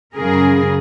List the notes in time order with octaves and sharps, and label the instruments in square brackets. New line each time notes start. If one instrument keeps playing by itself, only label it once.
[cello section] F#2 C#3 G#4 A#4